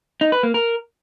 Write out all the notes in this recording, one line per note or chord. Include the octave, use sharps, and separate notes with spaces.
D#4
B4
A#3
A#4